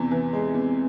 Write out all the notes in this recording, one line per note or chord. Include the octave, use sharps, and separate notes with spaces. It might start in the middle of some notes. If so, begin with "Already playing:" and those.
Already playing: E2 C3 E3
E3
G#3
E2